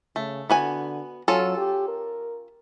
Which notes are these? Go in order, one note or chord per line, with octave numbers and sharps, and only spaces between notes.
C#3 A3
D3 B3 F#4 G#5
F#3 C#4 F4 A4
G4
A#4